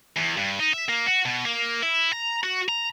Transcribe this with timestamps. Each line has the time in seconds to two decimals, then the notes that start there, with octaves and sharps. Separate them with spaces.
0.17 E2
0.37 G2
0.60 D#4
0.73 E5
0.89 A#3
1.07 F#4
1.25 B2
1.45 A#3
1.83 E4
2.13 A#5
2.44 F#4
2.69 A#5